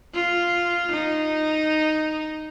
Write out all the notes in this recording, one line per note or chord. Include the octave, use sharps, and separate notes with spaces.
F4
D#4